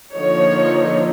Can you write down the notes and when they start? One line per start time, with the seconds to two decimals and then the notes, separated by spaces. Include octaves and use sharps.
0.13 D3 F3 A#3 D#4 C#5